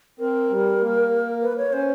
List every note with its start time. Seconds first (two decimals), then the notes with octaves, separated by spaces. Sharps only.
0.19 C4 A#4
0.50 G3
0.81 A#3
1.42 B4
1.58 C#5
1.73 C#4 C5